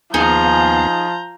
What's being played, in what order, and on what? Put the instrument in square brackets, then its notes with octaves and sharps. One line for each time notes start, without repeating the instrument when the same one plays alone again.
[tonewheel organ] D#2 B3 F5 [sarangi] F3 [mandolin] D#4 G#4 [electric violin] A#5 G6